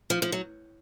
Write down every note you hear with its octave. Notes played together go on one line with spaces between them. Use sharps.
F3
F3
F#3